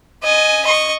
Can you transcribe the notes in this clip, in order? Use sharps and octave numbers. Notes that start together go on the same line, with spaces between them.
D#5 G#5
D#5 C#6